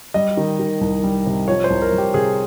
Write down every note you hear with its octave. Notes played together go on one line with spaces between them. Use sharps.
G3 D#5
D#3
D#3
C2
G3
C3
F3 C#5
C5
C2
A#4
C2
G4
C3 G#4